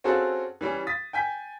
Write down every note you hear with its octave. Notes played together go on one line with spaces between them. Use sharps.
C4 C#4 F4 F#4 G#4 A4
E3 G3 C#4
D#6 A6 B6
G5 G#5 G6 B6